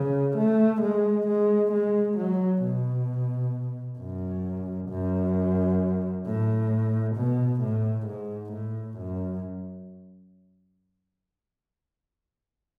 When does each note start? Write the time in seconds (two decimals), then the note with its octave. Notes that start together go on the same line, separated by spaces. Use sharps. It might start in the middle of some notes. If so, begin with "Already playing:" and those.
Already playing: C#3
0.37 A3
0.82 G#3
1.27 G#3
1.72 G#3
2.18 F#3
2.63 B2
3.99 F#2
4.89 F#2
6.26 A2
7.16 B2
7.62 A2
8.07 G#2
8.52 A2
8.98 F#2